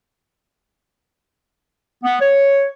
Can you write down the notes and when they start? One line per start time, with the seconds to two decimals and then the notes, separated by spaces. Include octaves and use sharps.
2.03 B3
2.20 C#5